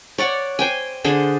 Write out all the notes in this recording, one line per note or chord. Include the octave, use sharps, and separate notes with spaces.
C#5 D5 F#5
C5 G5 G#5
D3 D4 G#4 C5